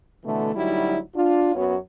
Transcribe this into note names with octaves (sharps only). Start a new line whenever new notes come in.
B2 D3 E3 A3
D2 F#3 G3 D#4 E4
D4 F4
F#2 F#3 B3 F#4 C#5